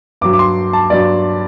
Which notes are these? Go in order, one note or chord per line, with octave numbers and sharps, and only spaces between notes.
G2 F#3 D6
D6
C6
A5
G2 F#3 D5